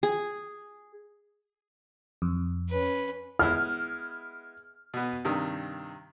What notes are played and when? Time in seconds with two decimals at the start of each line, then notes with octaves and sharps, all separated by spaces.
0.03 G#4
2.22 F2
2.70 C#4 B4
3.39 G#3 B3 E4 F6
4.94 B2 B3
5.25 G2 C3 D#3